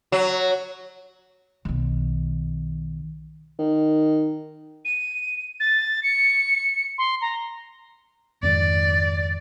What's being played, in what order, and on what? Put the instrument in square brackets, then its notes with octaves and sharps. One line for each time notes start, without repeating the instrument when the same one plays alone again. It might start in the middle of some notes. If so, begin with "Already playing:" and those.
[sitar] F#3
[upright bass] B1 D#3
[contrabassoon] D#3
[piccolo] D#7
A6
C#7
C6
A#5
[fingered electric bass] F2 G#2 D#3 [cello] D5